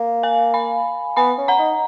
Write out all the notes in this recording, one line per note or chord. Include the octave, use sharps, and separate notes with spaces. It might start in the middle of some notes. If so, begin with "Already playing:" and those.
Already playing: A#3
F5 G#5
G#5 B5
B3 G#5 B5
C#4
F#5 A#5
D#4